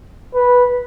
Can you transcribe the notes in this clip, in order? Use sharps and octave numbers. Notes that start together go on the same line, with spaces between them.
B4